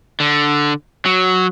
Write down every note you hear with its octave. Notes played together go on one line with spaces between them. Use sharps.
D3
F#3